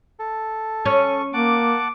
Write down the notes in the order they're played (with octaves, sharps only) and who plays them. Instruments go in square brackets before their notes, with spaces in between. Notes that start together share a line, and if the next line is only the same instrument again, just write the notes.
[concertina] A4
[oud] C#4 [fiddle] C#6
[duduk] A#3 [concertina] F#5 A5 [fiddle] D6